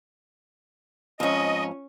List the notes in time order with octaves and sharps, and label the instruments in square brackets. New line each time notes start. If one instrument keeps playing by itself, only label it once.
[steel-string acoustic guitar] F2 G#2 [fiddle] C#4 [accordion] D#5